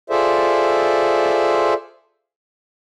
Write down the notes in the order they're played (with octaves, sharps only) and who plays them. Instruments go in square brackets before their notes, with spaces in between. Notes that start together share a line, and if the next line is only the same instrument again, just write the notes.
[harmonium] F4 G#4 A4 C5 D5 E5